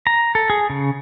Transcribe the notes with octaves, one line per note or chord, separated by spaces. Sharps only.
A#5
A4
G#4
C#3